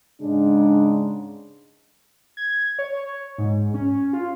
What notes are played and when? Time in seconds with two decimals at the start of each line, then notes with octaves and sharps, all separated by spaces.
0.21 G#2 C#3 G#3 D4
2.37 G#6
2.79 C#5
3.38 G#2
3.74 C#4
4.13 F4